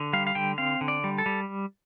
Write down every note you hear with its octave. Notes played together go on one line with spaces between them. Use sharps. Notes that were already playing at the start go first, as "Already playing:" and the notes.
Already playing: D3
G3 F5
F5
D3 G5
C4 F5
D3
D5
G3
A4
G3